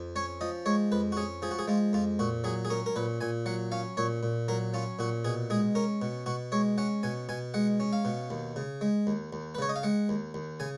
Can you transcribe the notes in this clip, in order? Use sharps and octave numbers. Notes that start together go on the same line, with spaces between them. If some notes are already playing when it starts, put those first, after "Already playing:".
Already playing: F2
C#4 C#5
F3 D#5
G#3 C#5
F2 B4
F#4
C#4 G#4
F3 G#4
F#4
G#4
G#3 F4
F2 F4
A#2 F#4
F#3 G#4
G#4
C#4 A#4
A#4
A#2 B4
A#2 G#5
F#3 F#5
C#4 F5
A#2 C#5
A#2
F#3 A#4
C#4 F4
A#2 F#4
B2 G#4
G#3 G#4
C#4 A#4
B2
B2 F#4
G#3 C#5
C#4 F#5
B2 G#5
B2 G#5
G#3 F#5
C#4
F5
B2
D#2
C#3
G#3
D#2
D#2
B4
C#3 C#5
D#5
F5
G#3 F#5
D#2
D#2
C#3 G#5